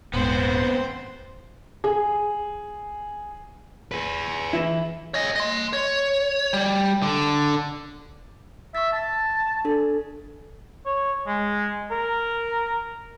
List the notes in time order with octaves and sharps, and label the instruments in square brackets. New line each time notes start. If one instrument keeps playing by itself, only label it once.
[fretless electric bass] D#1 G#2 [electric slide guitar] B3 C4 [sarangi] C5
[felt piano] G#4
[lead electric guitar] G#4 B4
[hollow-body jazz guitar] E3 E4
[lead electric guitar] C#5 D#5
D#5 C6
C#5
G3
D3
[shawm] E5 [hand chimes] C#6 A6
[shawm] A5
[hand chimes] D4 A4
[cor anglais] C#5
G#3
A#4